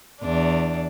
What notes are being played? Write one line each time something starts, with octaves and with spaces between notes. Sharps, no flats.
E2 D4